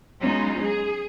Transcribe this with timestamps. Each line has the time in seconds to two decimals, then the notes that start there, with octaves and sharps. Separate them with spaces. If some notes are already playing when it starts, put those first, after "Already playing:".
0.20 F#3 G#3 B3 C#4 D#4 F4
0.60 G#4